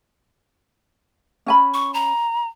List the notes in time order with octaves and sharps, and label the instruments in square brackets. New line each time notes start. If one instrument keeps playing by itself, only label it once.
[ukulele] C#4 G#5 B5
[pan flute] C#6
A#5